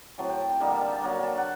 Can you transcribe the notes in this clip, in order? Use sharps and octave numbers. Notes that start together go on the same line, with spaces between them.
A2 F#3 C4 A5
G5
A5
A5
D3 G3 A#3 D#4 A5
A#5
A5
A5
F#3 A#3 D4 A#5
A5
F#5